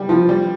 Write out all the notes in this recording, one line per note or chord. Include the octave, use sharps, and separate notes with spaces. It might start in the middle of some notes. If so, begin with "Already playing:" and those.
Already playing: G3
F3
G3